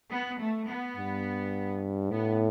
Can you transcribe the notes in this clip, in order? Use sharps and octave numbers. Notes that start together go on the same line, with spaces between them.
B3
A3
B3
G2
A2 B3